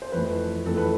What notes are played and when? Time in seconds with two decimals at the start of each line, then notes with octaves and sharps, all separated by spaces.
0.02 C5
0.12 F2 E3 A3 B4
0.66 F2 E3 A3 A4
0.77 B4